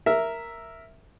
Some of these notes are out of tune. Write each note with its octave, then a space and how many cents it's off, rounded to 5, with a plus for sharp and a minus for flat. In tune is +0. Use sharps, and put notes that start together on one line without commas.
A#4 -5 E5 +0